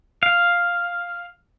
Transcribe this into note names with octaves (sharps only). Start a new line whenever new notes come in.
F5